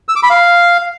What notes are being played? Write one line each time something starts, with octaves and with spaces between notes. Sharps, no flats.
E6
D6
B5
F5